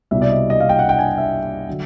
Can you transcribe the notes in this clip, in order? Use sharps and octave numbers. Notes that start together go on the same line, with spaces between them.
C2 B2 G3 E5
D5
D#5
D#5
F5
G5
F#5
G5
G#5
E5
D3 F#3